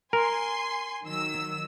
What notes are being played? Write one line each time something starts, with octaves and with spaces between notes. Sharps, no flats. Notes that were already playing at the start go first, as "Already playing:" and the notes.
A#4 G#5 C6
D#3 F#3 E6